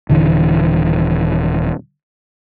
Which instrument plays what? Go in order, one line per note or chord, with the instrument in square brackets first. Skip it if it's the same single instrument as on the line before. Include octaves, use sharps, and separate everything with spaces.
[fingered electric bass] D#1 D3 E3